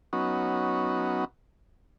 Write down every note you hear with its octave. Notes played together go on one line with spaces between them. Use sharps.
F#3 B3 C#4 D#4 F#4